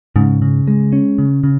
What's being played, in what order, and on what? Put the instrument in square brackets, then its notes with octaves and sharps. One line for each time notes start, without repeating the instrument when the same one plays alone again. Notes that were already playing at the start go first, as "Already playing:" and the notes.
[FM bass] G#2 [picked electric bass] C#3
[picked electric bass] C#3
G#3
C#4
C#3
C#3